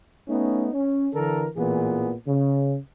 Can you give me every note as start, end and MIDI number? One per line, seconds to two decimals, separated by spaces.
0.28 0.69 57
0.28 0.69 59
0.28 0.69 61
0.28 0.69 63
0.73 1.08 61
1.14 1.47 50
1.14 1.47 52
1.14 1.47 69
1.14 1.47 70
1.56 2.12 33
1.56 2.12 46
1.56 2.12 52
1.56 2.12 59
1.56 2.12 68
2.27 2.75 49